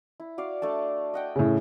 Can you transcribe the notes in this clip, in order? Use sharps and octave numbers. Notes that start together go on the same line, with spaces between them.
E4
F#4 D5 F5
A3 D4 A5
D#5 F#5 G5
A2 C#3